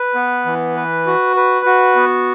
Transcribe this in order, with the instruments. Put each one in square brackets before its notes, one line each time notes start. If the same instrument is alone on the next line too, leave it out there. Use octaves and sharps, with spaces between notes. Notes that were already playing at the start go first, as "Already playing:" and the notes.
Already playing: [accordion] B4
B3
E3
B4
F#4
B4
F#4
B3